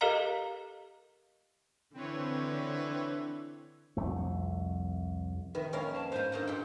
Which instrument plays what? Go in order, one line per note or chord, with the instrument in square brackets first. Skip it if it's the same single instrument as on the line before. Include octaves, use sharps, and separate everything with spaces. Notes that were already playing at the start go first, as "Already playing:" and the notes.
[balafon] G4 A4 A#4 D#5 F5 A#5
[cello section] D3 [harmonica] E3 [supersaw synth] C4 B4 C#5
[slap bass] C2 F2 A3
[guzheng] D#3 [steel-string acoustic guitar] B4 [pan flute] E5
[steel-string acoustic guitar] F2 A#3 [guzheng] C#4 A#4 F5 [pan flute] C#5
[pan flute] A5
[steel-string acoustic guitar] G#2 [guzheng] B4 F5 [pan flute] C5
[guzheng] G2 A#3 F#5 [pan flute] C5
[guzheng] A#2 G5 [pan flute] A4